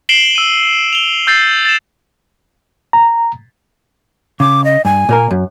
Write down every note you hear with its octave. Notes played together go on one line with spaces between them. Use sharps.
C7 D7 E7 F#7 G7
E6 D#7
F7 G7
E6 G6 A6 C7
A6 E7
A#5
C#3 D6
D#5
G2 G#5
A#2 A#3 A#4
F#2